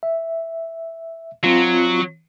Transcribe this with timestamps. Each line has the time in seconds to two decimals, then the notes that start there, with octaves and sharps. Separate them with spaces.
0.03 E5
1.44 F#3 C4 F4